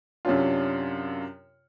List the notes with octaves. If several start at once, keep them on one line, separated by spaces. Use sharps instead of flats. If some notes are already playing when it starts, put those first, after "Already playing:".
F#2 C3 C#4 D4 F4